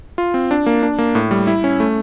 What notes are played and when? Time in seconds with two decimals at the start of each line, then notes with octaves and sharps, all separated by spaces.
0.18 F4
0.34 C4
0.51 D4
0.66 A#3
0.83 D4
0.99 A#3
1.15 A2
1.31 G3
1.47 E4
1.64 C#4
1.80 A3